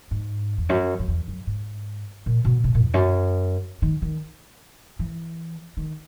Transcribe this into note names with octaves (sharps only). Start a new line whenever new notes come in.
G#2
E2
F#2
F#2
E2
F#2
G#2
A#2
B2
B2
A#2
E2
F#2
D#3
D#3
E3
D#3